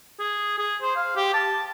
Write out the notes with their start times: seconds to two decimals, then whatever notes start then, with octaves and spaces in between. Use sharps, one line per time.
0.20 G#4
0.58 G#4
0.82 C5
0.96 F5
1.16 G4
1.34 A5